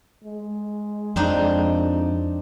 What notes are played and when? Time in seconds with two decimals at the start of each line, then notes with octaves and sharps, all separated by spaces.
0.24 G#3
1.16 F2 C4 D4 D#4